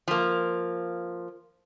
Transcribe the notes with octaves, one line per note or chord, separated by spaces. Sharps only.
F3 A#3